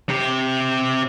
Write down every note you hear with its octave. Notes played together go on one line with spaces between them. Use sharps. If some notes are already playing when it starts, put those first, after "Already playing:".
C3 G4